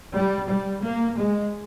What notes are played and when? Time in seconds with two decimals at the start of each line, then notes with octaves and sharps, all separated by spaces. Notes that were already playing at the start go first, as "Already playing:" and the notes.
0.15 G3
0.49 G3
0.83 A#3
1.17 G#3